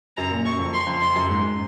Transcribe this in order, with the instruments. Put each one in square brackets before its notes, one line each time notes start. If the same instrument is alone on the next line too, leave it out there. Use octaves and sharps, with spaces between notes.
[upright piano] F#2 [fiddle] A#5
[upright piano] A#2
[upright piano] F#2 [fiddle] C#6
[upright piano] F2
[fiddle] C6
[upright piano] F2
[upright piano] F2 [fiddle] C6
[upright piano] F#2
G#2